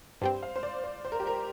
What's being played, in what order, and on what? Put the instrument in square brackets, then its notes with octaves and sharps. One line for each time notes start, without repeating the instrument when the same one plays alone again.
[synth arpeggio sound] G2 G3 C4 [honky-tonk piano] C5
[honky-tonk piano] F5
C5
D5
C5
C5
A#4
G4
A#4